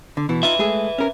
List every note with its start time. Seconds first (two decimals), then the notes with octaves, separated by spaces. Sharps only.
0.17 D3
0.29 B2 E3 E4
0.43 D#4 F4 B4 E5
0.59 G#3 A3 G#4
0.98 C#4 A#4